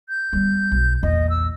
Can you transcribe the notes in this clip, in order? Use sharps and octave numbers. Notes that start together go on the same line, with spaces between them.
G6
G3 B3
B1
A#1 E2 D#5
E6